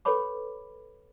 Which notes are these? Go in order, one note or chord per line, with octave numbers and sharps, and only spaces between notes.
G4 A4 B4 C#5 B5 D6